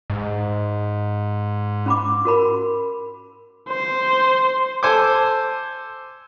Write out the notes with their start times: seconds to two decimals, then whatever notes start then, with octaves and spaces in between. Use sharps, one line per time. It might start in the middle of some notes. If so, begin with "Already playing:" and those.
0.10 G#2
1.86 C#4 B5 D6
2.25 F#4 A#4 B5
3.69 C5
4.83 A4 C5 G#5 D6